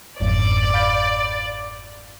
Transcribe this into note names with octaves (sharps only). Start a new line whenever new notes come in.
G1 F2 G#2 D5
F5 B5 G6